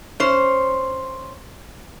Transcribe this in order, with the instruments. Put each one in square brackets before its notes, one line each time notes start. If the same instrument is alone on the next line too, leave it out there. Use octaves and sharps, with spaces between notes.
[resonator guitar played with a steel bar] C#4 C5